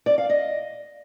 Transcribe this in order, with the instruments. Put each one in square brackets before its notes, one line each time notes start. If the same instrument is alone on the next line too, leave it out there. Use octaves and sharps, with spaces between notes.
[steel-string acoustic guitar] D5
F5
D#5